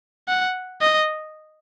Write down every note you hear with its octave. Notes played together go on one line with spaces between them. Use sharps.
F#5
D#5